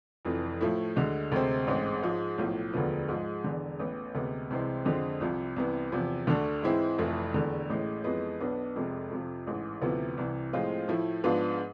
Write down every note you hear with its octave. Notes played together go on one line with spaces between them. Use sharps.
F1 F2 E3
A2 F3 A3 E4
D2 D3 G#3
D2 C3 G#3 C4
A1 G#2 G#3 C4
G#2 F3 G#3
B1 A2 F3
E1 D2 D3 F3 B3
G#2 F3 G#3
E1 E2 D3
A1 A2 E3 B3
D2 C3 G#3 B3
C2 C3 E3 G#3 C4
F2 D3 G#3 C4
C2 C3 F3
C2 C3 E3 B3
E2 C3 F3
D2 D3 A3 D4
G#2 E3 G#3 C4 E4
F1 F2 E3 A3 E4
E1 E2 D3 A3
A1 A2 G#3
F2 E3 G#3 B3
B1 B2 B3 D4
F1 F2 C3 G#3
F2 C3 F3
A1 G#2 E3
D2 C3 F3 B3 E4
C2 C3 E3
A2 F3 G#3 C4 F4
A2 F3 A3 E4
G#2 F3 B3 D4 F4